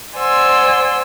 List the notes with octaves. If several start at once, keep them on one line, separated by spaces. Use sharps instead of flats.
C5 D5 F#5 G#5 C6 E6